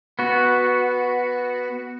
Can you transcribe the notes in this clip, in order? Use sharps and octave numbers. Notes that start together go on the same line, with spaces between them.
B3 F#4